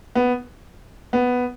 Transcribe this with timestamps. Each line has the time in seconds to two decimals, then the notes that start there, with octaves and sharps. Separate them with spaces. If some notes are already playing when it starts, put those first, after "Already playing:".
0.15 B3
1.13 B3